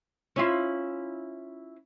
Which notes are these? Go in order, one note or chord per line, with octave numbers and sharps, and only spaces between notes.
C#4 E4 F4